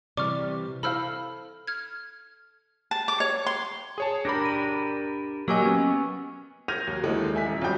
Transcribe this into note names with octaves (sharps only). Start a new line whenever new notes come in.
C3 E3 G3 D5 C#6 D6 F6
E4 A4 C5 F5 B5 E6 F6
F6 G#6
A5
D6
C#5
C6
G#4 C#5 A5
D4 G4 A#4 B5 D6 A#6
D#7
F#3 A#3 G4 D#5 G#5 C#6 E6
B3 C#4
F6 G6 G#6 A#6 D#7 F7
D#2 F#3
D#2 D3 E3 G#3 A3
E5 G#5 B6
D#1
B1 F2 G3 G5